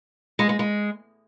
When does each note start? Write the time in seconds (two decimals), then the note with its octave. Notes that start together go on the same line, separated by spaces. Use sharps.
0.39 G#3
0.49 G#3
0.59 G#3